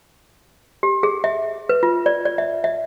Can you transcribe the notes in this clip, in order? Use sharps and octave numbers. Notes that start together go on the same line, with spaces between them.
G4
G#4
E5
B4
F4
D5
D5
E5
E5